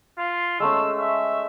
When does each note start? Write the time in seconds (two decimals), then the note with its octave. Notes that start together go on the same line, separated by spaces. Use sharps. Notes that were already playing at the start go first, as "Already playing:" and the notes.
0.18 F4
0.60 G#3 A3 C#4 E6
0.99 E5